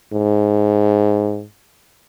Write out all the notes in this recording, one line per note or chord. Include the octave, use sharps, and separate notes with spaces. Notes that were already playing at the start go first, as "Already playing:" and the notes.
G#2